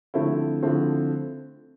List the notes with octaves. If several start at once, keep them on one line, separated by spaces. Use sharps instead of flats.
D3 F3 A3 C4 E4
D3 F3 A3 C4 E4